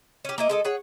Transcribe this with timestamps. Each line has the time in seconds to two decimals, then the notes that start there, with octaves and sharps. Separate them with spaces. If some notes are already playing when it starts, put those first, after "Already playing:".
0.25 C#4 G4
0.38 A#3 E4 D#5
0.49 G#3 A4 D#5
0.65 G#4 C#5 F#5